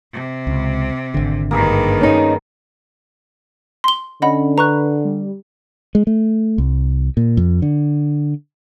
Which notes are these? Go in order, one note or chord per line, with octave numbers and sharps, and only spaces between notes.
C3
C#2
G#1 D3
G2 D#3 A#3 G#4 B4
C#4 D#4
C6 G7
D3 C#4 D#5 F#5 B5
B4 A#5 C#6 F#6
G3
G#3
A3
C2
A#2
F2
D3